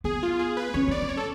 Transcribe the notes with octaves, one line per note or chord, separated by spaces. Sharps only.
B3 G#4
F4
G#4
B4
C#4 C#5
B3 D5
C#4
C#5
A4